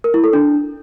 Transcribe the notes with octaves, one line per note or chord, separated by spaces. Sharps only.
A#4
E4
A4
D4